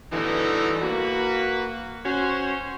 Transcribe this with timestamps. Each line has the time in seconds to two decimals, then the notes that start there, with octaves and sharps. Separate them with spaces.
0.13 G2 B2 D3 E3 A3 D#4
0.82 A#3 F#4 B4
2.06 C#4 F#4 C5